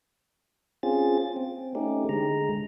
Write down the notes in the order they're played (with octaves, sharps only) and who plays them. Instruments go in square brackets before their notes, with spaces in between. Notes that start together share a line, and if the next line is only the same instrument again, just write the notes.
[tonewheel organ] C4 C#4 F4 G#4 A6
C4
A3 C#4 D#4 G4
D3 G#3 A#5